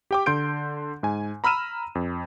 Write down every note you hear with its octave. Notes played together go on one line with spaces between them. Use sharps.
G4 G5 D6
D3 C6 G6 D7
G#2 G#5
A#5 B5 E6 F6 D#7 E7
F2